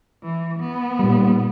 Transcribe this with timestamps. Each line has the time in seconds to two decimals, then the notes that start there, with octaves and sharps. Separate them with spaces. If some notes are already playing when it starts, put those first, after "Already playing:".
0.22 E3
0.59 B3
0.99 A#2 G3